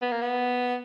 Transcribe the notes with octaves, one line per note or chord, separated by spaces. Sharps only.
B3
A#3
B3